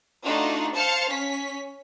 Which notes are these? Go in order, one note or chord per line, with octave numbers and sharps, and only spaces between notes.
A3 D4 D#4 F4 F#4
C5 F5 A5 F6 C#7
C#4 B6